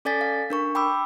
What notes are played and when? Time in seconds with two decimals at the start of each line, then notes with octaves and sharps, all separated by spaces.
0.05 C#4 A4 D5 G#5 A6 B6
0.21 F5
0.50 D4 A#4 C#6
0.75 G5 B5 D6 E6